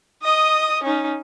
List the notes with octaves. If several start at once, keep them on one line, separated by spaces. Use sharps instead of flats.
D#5 D#6
C#4 D#4